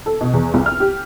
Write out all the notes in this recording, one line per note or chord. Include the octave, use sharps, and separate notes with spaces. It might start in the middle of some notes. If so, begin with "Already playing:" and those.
A4
B2
E2
C2
F6
G4